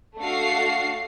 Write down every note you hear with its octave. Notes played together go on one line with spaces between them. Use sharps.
A3 D4 F#4 F5 C7